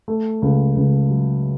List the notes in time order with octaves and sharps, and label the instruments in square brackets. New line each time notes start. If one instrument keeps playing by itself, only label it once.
[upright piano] A3
C#2
C#2
F#3